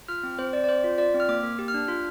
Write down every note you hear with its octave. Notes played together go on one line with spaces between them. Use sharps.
F4 F6
C4
C4 C5
C4 D5
D5
C4 C5
F4
F4 D5
C4
F6
A#3 D6
A#3
G4
F6
D4
F4